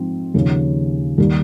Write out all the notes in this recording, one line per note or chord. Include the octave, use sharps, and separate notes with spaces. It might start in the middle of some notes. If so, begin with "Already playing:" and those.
Already playing: G#2 F3 C4 D#4
D#2 C#3 F3
D#2 D#3 G3